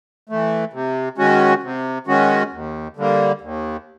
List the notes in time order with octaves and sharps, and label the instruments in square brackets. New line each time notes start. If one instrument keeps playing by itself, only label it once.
[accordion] E3 A3
C3
D#3 G#3 C#4 F#4
C3
D#3 G#3 C#4 F#4
D#2
D3 G3 A#3
D#2